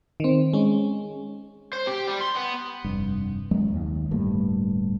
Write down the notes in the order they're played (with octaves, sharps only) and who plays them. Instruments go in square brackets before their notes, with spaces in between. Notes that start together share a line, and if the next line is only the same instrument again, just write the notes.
[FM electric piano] D#3 C4
G#3 C#4
[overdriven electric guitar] C5
G4
G3
C6
B3
[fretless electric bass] F1 G2
F#2 F#3 G#3 A#3
D#2
D1 G2 A3 A#3